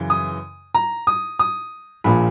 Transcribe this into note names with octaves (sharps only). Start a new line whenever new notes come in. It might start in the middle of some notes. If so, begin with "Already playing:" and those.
Already playing: F#2 C#3 E3
D#6
A#5
D#6
D#6
A#1 A#2 F3 B5